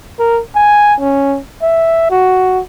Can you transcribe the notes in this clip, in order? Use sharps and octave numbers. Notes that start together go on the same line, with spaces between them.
A#4
G#5
C#4
E5
F#4